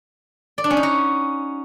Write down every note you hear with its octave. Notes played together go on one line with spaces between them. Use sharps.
D5
D4
C#4
D#4
F#4